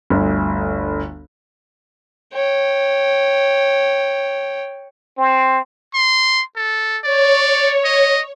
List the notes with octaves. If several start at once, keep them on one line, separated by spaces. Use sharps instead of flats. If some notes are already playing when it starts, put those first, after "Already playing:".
G1 D2
C#5 G5
C4
C6
A4
C#5 D5
D#5